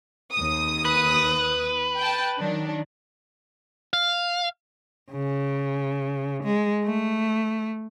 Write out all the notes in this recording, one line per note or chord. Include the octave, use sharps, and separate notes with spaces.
D#2 D#6
B4
G5 A5
D#3 F#3 D4
F5
C#3
G#3
A3